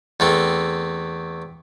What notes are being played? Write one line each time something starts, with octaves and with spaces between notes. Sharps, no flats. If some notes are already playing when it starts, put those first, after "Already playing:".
E2 A3 C4